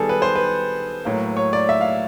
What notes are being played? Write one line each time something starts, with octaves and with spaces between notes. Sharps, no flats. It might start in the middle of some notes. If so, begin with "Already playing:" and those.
Already playing: D#3 G3 B3 G#4 A4
B4
C5
B4
A2 F#3 A#3
C#5
D5
E5
F5